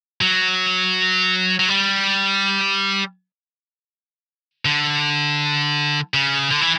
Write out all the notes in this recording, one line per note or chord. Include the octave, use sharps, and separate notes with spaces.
F#3
F#3
G3
D3
C#3
D3
E3